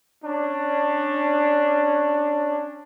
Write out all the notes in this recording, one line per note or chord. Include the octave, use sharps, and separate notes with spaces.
C#4 D4